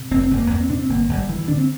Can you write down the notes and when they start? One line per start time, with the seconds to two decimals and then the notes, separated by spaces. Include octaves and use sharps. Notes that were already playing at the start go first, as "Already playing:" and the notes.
Already playing: C3
0.11 F1 C4
0.24 C4
0.31 F1
0.37 A#3
0.50 E2 A#3
0.61 C4
0.69 C3 D4
0.80 C4
0.89 G1 A#3
1.09 G1
1.15 G3
1.28 G2 E3
1.39 E3
1.48 D3 D4
1.58 C4